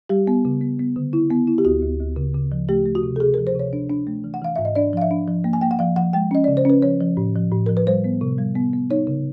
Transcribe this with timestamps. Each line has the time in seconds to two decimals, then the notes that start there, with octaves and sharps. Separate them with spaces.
0.09 G3 G4
0.27 B3
0.45 C#3
0.61 B3
0.79 B3
0.96 D3
1.13 E4
1.30 B3
1.47 E4
1.58 G4
1.65 D2 F#4
1.82 D2
1.99 D2
2.16 C#3
2.35 C#3
2.52 F3
2.69 A3 G4
2.86 A3
2.95 F#4
3.03 C3
3.16 A4
3.20 C3 G#4
3.34 A#4
3.38 F3
3.47 C5
3.55 C3 C#5
3.73 D4
3.90 D4
4.07 A3
4.24 E3
4.34 F#5
4.42 E3 F5
4.56 G#2 E5
4.65 D#5
4.75 D4 D5
4.93 F3 F5
5.02 E5
5.11 D4
5.28 F3
5.44 A#3
5.53 G#5
5.61 A#3 G5
5.71 F#5
5.79 F3 F5
5.96 F3 F#5
6.13 G#3 G5
6.31 C#4 D#5
6.44 C#3 D5
6.57 C5
6.65 C#4 B4
6.82 F3 C#5
7.01 F3
7.17 A2
7.35 F3
7.52 A2
7.66 F3 A#4
7.77 B4
7.87 G3 C5
8.04 B3
8.21 C3
8.38 G3
8.55 B3
8.73 B3
8.90 D#4 C#5
9.07 C#3